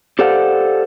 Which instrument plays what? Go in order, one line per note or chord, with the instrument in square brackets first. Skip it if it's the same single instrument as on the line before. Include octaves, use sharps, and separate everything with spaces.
[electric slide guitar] G4 A4 C5 D5 F5 F#5